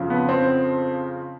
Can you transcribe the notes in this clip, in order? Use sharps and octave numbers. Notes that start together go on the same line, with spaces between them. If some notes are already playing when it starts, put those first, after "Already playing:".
Already playing: F2 C#3 F3
B3
C4